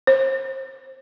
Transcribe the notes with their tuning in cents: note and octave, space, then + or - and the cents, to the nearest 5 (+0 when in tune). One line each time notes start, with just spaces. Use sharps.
C5 +30